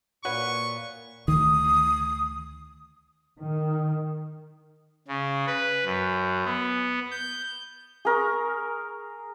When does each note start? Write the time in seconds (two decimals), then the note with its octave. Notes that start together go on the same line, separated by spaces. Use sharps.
0.25 A#2 F#4 B4 C#5 C#6
1.28 D2 D#3 D#6
3.38 D#3
5.08 C#3
5.47 B4
5.85 F#2
6.45 B3
7.11 G6
8.05 G#4 A#4 C#6